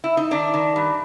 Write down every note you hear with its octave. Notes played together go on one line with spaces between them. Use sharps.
E4
D#4
D#3 D4
D#3
G2